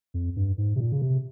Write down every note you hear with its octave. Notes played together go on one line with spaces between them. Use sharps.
F2
G2
G#2
C3
A#2
C#3
C3